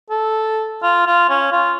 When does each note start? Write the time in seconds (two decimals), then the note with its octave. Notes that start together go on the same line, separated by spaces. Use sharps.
0.10 A4
0.83 F4
1.07 F4
1.29 C#4
1.52 F4